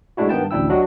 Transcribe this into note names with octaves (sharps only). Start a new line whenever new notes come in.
G#2 G#3 A3 D4 E4 F#4
G2 D#3 B3 G5 A5
A1 D2 D4 E4 G5 E6
F#3 D4 F#4 G4 D#5